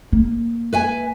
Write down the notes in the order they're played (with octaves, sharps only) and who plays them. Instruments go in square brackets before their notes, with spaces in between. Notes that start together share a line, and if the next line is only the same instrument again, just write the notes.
[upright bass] A#3
[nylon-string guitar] B4 E5 G#5